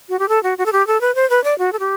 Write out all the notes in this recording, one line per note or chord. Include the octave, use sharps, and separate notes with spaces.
F#4
G4
A4
F#4
F#4
A4
G4
A4
B4
C5
B4
D5
F#4
A4
G4